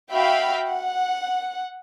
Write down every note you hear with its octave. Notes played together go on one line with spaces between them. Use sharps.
F#4 E5 F5 G5 B5
F#5